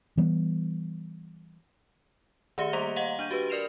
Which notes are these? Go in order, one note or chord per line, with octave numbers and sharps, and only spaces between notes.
E3 G3 B3
D#3 A3 G4 E5 C#7
G3 A#3 A#5 C6 D6 F7
D#5 F5 F#5 A#5 C6
D4 C#6 G6 D#7
F#4 G4 B4
A#4 D5 F6 C7 E7 F7